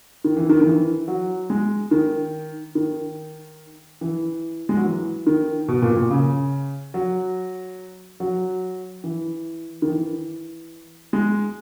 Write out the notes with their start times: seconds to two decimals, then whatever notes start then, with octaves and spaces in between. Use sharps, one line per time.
0.24 D#3
0.37 E3
0.49 D#3
0.61 D#3
0.66 E3
1.08 F#3
1.50 G#3
1.91 D#3
2.75 D#3
4.01 E3
4.69 G#3
4.77 F#3
4.85 E3
5.27 D#3
5.68 B2
5.82 A#2
5.96 A#2
6.10 C#3
6.94 F#3
8.20 F#3
9.04 E3
9.82 D#3
9.87 E3
11.13 G#3